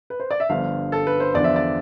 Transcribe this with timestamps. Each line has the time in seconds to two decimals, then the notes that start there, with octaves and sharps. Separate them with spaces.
0.10 B4
0.20 C5
0.31 D5
0.40 E5
0.49 G1 G2 F3 F5
0.92 A4
1.07 B4
1.20 C5
1.34 E2 D3 F3 D5
1.44 E5
1.56 D5